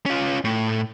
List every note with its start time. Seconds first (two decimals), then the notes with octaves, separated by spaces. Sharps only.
0.06 C#4 F4
0.45 A2